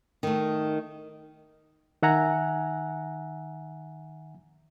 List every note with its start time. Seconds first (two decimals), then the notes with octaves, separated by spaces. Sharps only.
0.23 D#3 A3
2.02 D#3 E5 F#5 G#5 A#5